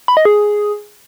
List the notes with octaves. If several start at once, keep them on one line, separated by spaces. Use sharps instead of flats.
B5
D#5
G#4